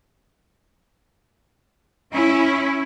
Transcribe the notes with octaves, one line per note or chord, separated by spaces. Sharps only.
C#4 E4